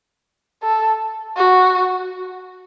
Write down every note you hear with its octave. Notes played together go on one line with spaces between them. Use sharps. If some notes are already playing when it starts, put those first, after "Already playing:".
A4
F#4